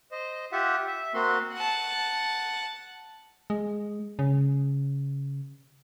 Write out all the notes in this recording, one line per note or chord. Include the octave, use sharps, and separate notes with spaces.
C5 D#5
F4 G4 E5 F#5
E5
A#3 C4 F#4 C6
F#5 A5
G#3
C#3